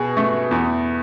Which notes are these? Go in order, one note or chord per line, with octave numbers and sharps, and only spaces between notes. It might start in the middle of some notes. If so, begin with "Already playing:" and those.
Already playing: B2 G#4
A3
E2